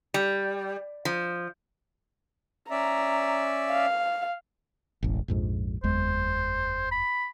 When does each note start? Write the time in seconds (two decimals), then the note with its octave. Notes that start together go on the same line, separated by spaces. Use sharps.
0.14 G3
1.05 F3
2.70 C#4 D5 E5 A#5
3.71 F5
5.03 E1 A1
5.28 A#1 F2 G#2
5.84 F#1 E2 G#3 C5
6.91 B5